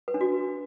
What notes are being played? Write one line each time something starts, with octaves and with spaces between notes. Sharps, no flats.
B4
D4
F#4